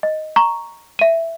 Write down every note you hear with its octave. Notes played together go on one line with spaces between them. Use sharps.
D#5
A#5 C#6
E5 D#7